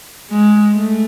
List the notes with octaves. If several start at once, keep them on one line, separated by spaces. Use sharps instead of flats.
G#3
A3